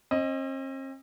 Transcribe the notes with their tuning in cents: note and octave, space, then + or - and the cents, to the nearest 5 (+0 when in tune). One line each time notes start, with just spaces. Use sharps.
C4 +45 D#5 +5